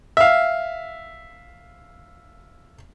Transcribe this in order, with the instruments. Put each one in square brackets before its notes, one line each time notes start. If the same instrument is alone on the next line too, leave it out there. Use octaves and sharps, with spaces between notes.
[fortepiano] E5 F5